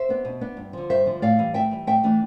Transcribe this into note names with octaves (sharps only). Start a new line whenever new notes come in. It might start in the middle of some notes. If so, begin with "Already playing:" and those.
Already playing: C5 E5
B3 D4
B2
B3 D4
G2
D3 F3
G2 C5 E5
D3 F3
A2 D5 F5
E3 G3
A2 E5 G5
E3 G3
A2 E5 G5
E3 A3 D4